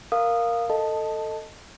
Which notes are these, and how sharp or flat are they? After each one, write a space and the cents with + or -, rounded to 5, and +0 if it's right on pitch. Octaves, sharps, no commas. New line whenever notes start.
A#4 +0 F5 +0 D#6 -15
A4 +15 D#5 +0 A5 +0